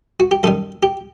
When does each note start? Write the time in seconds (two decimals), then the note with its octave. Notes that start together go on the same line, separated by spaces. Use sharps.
0.20 F#4
0.31 G4
0.43 F#2 D#3 G3 A4
0.83 G4